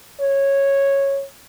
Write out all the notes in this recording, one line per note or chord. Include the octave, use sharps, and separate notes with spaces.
C#5